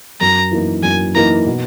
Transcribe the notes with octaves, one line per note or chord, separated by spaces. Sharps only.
F#2 A#5
E3 A#3 D#4 A#4
F#2 G#5
E3 A#3 D#4 A#4 A#5
B2